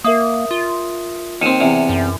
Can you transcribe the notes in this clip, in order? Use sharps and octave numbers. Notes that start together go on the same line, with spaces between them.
A#3 A#4 E5 D#6
F4
D#2 C4 C#7 D#7 E7
E2 C3
F#2